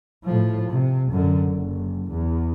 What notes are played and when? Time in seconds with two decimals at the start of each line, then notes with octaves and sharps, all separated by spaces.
0.25 A2 F3
0.70 C3
1.12 F#2 D3
1.51 F#1
2.11 E2